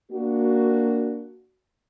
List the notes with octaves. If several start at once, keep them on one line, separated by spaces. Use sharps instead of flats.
A#3 D4 F#4